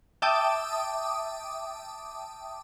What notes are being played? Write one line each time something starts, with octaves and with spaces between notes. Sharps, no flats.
E5 G5 A5 D6 D#6